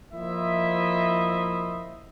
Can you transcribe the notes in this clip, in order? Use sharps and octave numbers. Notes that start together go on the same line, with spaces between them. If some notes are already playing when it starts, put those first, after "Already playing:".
F3 A#3 E4 C5 D#5 E5